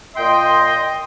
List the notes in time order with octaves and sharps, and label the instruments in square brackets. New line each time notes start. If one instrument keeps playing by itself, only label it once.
[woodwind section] A#2 G5 C6 [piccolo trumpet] D#5